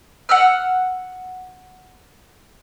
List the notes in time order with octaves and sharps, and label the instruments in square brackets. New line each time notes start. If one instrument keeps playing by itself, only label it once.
[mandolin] F#5 E6 F6